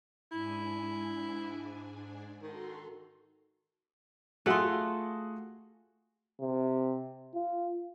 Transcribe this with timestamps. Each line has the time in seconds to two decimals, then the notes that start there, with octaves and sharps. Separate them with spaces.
0.31 G#2 D4 E4 G#5
2.42 D#3 F#4 A4 C6
4.46 A3 F4 F#4 G#4 F#6
6.40 C3
7.34 F4